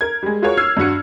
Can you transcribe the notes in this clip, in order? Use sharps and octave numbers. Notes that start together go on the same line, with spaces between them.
A#4 G#6
G3 G#3
F4 F#4 G#4 A#4 C#5 C#6
E6 F6 G#6 C7
G2 D4 F#4 C#7